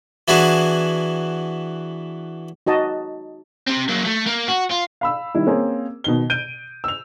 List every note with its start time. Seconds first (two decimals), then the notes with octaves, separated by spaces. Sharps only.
0.28 E3 B3 D4 E4 F#4 G#4
2.67 D#4 F#4 D#5 A5
3.67 C3 C4
3.89 F#3 A#3
4.05 A3
4.27 A#3
4.48 F#4
4.71 F4
5.01 F5 B5 E6
5.35 D#3 G3 E4
5.47 A#3 C4 C#4 G#4
6.04 B2 D#3 G7
6.30 G6 D7 D#7 G7
6.84 E6 F7